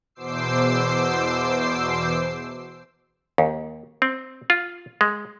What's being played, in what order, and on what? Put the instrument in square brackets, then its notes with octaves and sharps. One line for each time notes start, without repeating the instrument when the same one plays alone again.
[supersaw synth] E2 B2 C5 D6 E6 C7
[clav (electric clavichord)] D#2
C4
F4
G#3